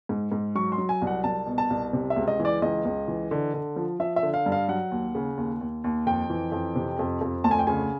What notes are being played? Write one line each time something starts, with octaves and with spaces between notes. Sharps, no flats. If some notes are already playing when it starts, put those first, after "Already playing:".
G#2
G#2
F#3 C#6
C6
F#3
G#5
C2
F#5
C2 A5
B2
A5
C2
C3
E5
C#2
D#5
E3
D5
C#2 D#5
C#2
E3
D3
D3
F3
F3 E5
E5
D3
F5
G2
F5
F#3 F#5
D#2
C#3
D#2
D#2
D#2
F2 G5
E3
F2
C3
F2
F2
D2 A5
G#5
G5
C#3 G#5